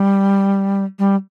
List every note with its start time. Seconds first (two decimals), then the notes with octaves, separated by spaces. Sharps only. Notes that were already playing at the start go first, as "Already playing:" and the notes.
Already playing: G3
0.99 G3